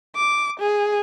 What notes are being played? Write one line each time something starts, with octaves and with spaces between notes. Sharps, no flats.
D6
G#4